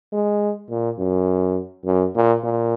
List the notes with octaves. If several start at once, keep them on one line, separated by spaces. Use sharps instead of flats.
G#3
A#2
F#2
F#2
A#2
A#2